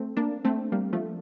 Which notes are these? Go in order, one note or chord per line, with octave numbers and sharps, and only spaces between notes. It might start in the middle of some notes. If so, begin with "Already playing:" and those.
Already playing: A3 C4
A#3 D4
A3 C4
G3 A#3
F3 A3